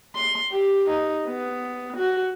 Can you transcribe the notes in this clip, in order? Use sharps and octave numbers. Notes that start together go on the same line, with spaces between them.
C6
G4
D#4
B3
F#4